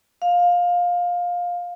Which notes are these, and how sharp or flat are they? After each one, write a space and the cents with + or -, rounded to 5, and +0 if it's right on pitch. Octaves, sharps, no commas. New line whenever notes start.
F5 +15